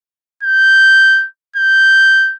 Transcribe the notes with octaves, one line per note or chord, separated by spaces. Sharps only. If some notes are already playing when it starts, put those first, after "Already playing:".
G6
G6